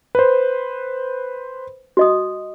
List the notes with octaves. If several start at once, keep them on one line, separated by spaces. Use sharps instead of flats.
B4 C5
F#4 D#5 D#6